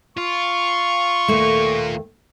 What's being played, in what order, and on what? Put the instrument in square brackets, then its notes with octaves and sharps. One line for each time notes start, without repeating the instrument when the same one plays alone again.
[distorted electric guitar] F4 [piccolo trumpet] C#6
[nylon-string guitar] D#2 A3 [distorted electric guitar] A#3 F4